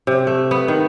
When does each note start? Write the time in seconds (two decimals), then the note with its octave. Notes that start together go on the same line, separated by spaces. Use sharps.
0.07 C3
0.27 A3
0.51 B3
0.68 D#3